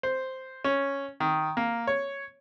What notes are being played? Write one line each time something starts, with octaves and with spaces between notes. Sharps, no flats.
C5
C#4
D#3
A#3
C#5